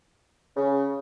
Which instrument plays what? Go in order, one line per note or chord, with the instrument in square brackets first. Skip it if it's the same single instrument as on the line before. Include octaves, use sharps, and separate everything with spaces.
[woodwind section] C#3